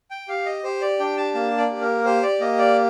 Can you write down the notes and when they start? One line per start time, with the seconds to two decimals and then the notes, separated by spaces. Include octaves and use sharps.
0.11 G5
0.28 G4 F5
0.46 D#5
0.64 G4 C5
0.81 D5
0.99 D4 G5
1.17 A5
1.34 A#3 A5
1.57 D5
1.70 G4
1.81 A#4
2.05 G4 C5
2.23 D5
2.40 A#3 D#5
2.58 D5